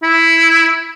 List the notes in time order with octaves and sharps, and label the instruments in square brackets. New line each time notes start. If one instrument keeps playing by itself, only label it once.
[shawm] E4